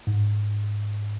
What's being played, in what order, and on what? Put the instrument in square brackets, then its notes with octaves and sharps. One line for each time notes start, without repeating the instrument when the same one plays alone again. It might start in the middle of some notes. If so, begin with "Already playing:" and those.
[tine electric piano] G#2